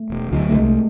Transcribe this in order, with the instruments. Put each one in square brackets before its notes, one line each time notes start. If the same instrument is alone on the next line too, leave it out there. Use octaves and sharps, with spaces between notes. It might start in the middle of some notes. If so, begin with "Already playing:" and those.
Already playing: [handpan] A3
[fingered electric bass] E1
D2 D3 F#3
[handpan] A3
[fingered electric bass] C2 [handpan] G#3
[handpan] A3